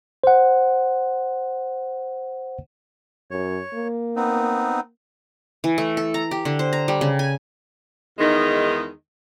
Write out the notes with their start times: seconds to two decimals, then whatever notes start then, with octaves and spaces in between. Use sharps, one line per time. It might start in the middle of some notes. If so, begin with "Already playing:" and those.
0.24 C5 F#5
3.31 F#2 C#5
3.74 A#3
4.16 B3 C4 D#4
5.64 E3
5.78 A3
5.97 A4
6.14 A#5
6.31 G4
6.45 D3
6.59 C5
6.73 A#5
6.88 G3
7.01 C#3
7.19 G#5
8.19 E2 D#3 G#3 D#4